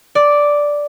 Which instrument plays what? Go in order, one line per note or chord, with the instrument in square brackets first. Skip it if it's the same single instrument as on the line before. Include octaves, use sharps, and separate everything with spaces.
[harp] D5